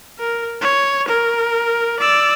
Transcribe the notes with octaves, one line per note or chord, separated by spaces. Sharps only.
A#4
C#5
A#4
D5 E6